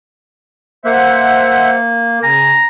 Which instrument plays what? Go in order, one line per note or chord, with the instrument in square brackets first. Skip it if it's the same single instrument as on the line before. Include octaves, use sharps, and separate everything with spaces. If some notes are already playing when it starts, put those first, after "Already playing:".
[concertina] A#3 [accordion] C5 E5 F#5
[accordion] C#3 G#5 [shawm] A#5